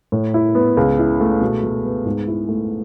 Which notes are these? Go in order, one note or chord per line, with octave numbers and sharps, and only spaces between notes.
A2
E4
B3
C#2
E4
A3
B2
B2
B3
G#2
E4
A3